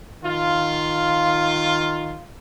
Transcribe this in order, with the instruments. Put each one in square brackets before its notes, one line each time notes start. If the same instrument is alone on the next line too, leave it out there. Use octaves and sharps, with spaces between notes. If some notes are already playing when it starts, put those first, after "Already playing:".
[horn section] D#3 F4